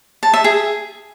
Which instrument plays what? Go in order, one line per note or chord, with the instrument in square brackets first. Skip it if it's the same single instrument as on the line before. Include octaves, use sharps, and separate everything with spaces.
[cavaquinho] A5
E5
G#4